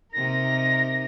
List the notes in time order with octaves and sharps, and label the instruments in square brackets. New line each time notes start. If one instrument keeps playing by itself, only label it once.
[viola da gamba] C3 D#4 A#4 [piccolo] A#6